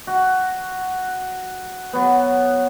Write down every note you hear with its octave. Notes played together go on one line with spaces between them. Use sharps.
F#4
F#3 B3